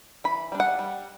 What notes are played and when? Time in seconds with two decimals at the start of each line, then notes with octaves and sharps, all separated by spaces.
0.24 E3 B5
0.52 G3 D4
0.60 F#5
0.79 G3